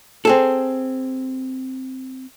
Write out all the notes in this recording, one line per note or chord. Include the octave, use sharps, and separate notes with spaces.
C4 G#4 A4